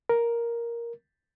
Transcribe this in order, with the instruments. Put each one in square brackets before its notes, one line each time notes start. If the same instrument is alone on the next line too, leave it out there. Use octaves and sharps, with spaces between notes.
[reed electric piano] A#4